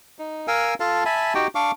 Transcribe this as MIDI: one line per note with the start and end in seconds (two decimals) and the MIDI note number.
0.19 0.47 63
0.48 0.74 70
0.48 0.74 77
0.48 0.74 80
0.48 0.74 88
0.80 1.04 65
0.80 1.04 69
0.80 1.04 77
0.80 1.04 81
1.06 1.34 76
1.06 1.34 80
1.06 1.34 81
1.06 1.34 83
1.35 1.47 63
1.35 1.47 66
1.35 1.47 67
1.35 1.47 79
1.55 1.71 62
1.55 1.71 77
1.55 1.71 85
1.55 1.71 86